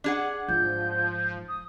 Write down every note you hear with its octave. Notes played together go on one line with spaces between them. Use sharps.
D4 G#4 F#5
G#2 F3 G6
D#6